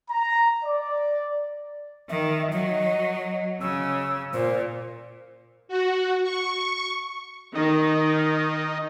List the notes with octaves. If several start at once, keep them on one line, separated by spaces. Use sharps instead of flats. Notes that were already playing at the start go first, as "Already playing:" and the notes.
A#5
D5
D#3 E5
F#3 D#5
C#3 E6
A#2 C5
F#4
C#6
D#3 D#4